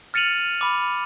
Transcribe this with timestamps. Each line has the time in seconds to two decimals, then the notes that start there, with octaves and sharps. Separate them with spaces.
0.14 F6 A6 C#7 D#7 F7 F#7
0.61 B5 D6